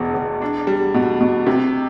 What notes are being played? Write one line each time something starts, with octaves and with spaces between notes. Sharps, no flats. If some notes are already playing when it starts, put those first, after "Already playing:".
Already playing: E1 E2 B2
E1
D4
G3
B2
B2
C3